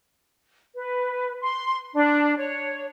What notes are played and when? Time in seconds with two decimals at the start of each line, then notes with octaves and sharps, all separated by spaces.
0.76 B4
1.41 C6
1.94 D4
2.37 C#5